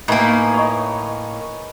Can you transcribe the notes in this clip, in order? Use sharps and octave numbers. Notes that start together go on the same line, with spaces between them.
A2 A#3 D#4 B4 G#5
C#5 D#5